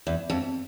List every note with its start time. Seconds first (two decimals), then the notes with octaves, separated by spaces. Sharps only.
0.07 E2
0.30 F2